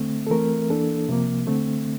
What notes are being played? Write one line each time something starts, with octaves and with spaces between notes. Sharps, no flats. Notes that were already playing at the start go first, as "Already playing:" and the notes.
Already playing: D3 A3 C4
A4
E3 A3 C4 A#4
E3 A#3 D4 A4
C3 F3 A#3
D3 A3 C4